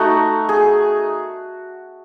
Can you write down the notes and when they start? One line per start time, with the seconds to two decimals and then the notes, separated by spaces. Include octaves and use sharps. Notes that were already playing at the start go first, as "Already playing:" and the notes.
Already playing: A3 D#4 F#4
0.49 G#4